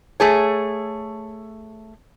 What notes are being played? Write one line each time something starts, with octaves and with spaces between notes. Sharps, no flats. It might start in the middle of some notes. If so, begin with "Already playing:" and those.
A3 G#4 C#5